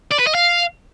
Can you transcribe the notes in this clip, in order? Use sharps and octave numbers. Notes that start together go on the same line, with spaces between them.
D5
B4
D#5
F5